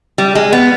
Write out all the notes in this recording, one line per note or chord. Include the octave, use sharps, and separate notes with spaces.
G3
G#3
B3